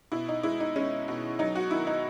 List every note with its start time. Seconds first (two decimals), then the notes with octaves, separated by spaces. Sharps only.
0.12 B2 E4
0.29 D#4
0.43 G#3 E4
0.60 D#4
0.76 G#3 C#4
1.08 B2
1.39 F#3 D#4
1.56 F#4
1.71 D#3 E4
1.87 D#4